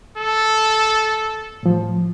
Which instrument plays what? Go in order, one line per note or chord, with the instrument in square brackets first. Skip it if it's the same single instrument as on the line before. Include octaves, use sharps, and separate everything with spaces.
[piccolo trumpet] A4
[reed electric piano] A2 F3